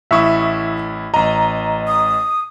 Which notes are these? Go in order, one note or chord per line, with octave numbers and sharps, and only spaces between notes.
A1 E4 E5 C#6 D#6
A1 D#5 A#5
D#6